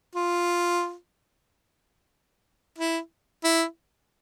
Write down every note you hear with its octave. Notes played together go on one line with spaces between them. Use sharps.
F4
E4
E4